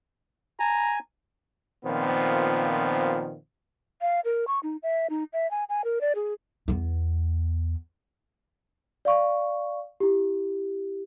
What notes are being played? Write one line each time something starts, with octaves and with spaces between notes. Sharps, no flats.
G#5 A#5
A#2 D#3 F3 B3 C4
F5
A#4
C#6
D#4
E5
D#4
E5
G#5
G#5
A#4
D5
G#4
E2 B3
D5 F5 C#6
E4 G4